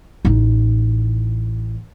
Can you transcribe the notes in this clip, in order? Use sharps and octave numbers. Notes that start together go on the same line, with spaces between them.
A1 D#4